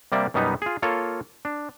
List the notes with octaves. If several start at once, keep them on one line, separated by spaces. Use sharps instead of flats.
C3 G3 A#3 D5 E5
F#2 B2 G3 B3 D#4
F4 G#4
A#3 F4 A4 C#5
D4